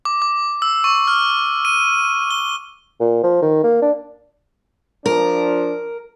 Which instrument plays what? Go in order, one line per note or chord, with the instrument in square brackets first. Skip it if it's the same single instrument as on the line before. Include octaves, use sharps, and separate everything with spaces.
[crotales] D6
D6
E6
C#6
F6
D#7
G7
[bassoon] A#2
F3
D#3
A#3
D4
[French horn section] F3 D4 [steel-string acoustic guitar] A#4